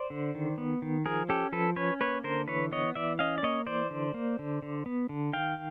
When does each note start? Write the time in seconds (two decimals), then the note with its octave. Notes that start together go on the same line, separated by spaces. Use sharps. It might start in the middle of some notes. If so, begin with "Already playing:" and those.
Already playing: C5 D5
0.10 D3
0.35 D#3
0.58 B3
0.82 D#3
1.06 F3 G#4 A#4
1.29 C#4 G4 A4
1.52 F3 A4 B4
1.76 C#4 B4 C#5
2.00 A#3 B4 C#5
2.24 D3 A#4 C5
2.48 E3 B4 C#5
2.72 B3 C#5 D#5
2.95 E3 D5 E5
3.19 C#4 D#5 F5
3.38 D5
3.43 A#3 C#5 D#5
3.67 E3 C5 D5
3.90 D3
4.14 A#3
4.39 D3
4.62 D3
4.86 B3
5.09 D3
5.33 D#3 F5 G5